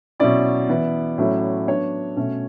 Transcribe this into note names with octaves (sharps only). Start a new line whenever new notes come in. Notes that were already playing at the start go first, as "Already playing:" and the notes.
B2 F#3 C#4 E4 D5
E3 B3 E4
A2 F#3 A3 C#4 E4
F#3 B3 D4 C#5
B2 A3 C#4